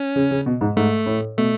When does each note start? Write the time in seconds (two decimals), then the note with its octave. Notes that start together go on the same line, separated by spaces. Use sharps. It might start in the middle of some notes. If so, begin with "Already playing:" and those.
Already playing: C#4
0.16 C#3
0.31 C#3
0.46 B2
0.61 G#2
0.77 G#2 A3
1.06 A2
1.37 B2 A3